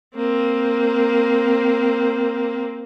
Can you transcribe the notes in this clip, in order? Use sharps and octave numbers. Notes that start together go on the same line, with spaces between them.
A#3 C4